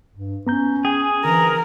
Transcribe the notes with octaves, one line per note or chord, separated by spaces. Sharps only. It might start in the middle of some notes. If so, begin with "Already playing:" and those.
G2
B3 C#4 A#5 G6
G#4 G5
D3 E3 A#4